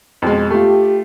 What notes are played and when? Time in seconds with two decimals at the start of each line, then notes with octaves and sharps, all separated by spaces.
0.22 F2 B2 G#3
0.50 A3 F4 G4